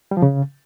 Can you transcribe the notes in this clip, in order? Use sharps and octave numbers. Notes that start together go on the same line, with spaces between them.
G3
F3
C#3